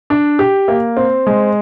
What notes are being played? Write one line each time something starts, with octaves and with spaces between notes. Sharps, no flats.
D4
G4
A#3
C4
G#3